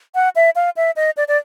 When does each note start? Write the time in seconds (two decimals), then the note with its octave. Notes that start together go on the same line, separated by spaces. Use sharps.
0.15 F#5
0.36 E5
0.56 F5
0.77 E5
0.96 D#5
1.17 D5
1.28 D5